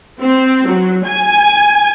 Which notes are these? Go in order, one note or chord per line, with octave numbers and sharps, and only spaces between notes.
C4
F#3
G#5